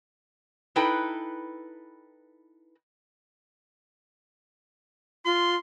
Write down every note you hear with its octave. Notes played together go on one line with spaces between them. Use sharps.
D#4 E4 A4 B4 G5
F4 C6